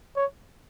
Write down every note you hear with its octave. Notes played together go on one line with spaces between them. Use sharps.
C#5